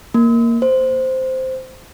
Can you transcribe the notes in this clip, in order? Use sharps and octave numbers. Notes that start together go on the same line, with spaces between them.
A#3
C5